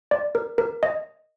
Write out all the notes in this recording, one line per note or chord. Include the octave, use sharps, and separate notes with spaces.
D5
A#4
A#4
D#5